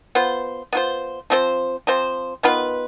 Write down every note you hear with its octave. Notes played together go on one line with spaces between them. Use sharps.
B3 F4 C5
B3 F4 C5
F3 C4 F4 C5
F3 C4 F4 C5
D#3 B3 F4 B4